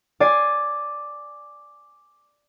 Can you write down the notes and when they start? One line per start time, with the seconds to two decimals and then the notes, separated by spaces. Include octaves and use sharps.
0.20 D5 G#5 C7